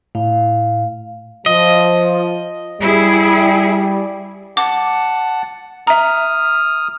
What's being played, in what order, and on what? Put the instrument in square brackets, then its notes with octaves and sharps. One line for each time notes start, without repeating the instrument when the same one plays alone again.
[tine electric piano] A2 [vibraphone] F5
[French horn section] F3 [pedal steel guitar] D#5
[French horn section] G3 [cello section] E4 G#4
[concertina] F#5 A5 [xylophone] D6
[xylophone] E5 A#5 [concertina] D#6 F6